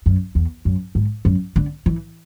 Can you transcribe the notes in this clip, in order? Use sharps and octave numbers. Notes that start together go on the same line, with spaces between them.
F#2
E2
F#2
G#2
F#2
D3
E3